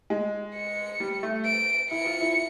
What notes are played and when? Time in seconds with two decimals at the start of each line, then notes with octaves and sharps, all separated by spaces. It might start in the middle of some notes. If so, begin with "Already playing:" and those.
0.10 G#3
0.55 C#7
1.00 G3
1.23 A3
1.45 D7
1.91 E4 C#7
2.06 F4
2.21 E4